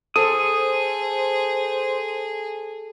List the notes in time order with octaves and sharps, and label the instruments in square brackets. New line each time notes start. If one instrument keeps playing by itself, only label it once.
[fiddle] G#4 [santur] A4 [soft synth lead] C5 [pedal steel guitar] D#6